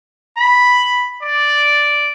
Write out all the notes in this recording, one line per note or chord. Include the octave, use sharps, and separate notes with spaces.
B5
D5